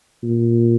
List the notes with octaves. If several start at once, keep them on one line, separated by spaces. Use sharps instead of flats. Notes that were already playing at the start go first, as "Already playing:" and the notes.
A#2